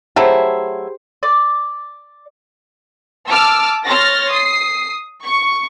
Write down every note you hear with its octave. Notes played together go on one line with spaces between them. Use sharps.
F#3 A3 E4 G4 G#4 C5
D5
A5 D6 E6 F6
C#5 C6 F6 A6 A#6
D#6 C7
C#6